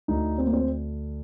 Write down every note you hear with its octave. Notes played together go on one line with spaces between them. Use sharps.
D2 D3 D#4
C4
A#3
C4